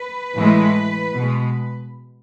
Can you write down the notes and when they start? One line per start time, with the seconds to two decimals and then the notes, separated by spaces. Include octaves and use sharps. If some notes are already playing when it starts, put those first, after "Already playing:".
Already playing: B4
0.36 A2 E3 G#3
1.15 B2 G#3